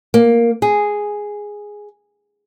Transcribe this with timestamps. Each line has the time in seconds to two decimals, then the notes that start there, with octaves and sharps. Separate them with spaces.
0.14 A#3
0.62 G#4